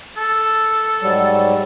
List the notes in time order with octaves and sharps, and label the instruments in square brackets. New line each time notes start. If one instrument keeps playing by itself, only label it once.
[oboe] A4
[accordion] G#2 F#3 G3